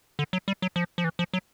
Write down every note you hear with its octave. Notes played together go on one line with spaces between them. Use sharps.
D3
F#3
G3
F#3
F3
F3
E3
F3
F#3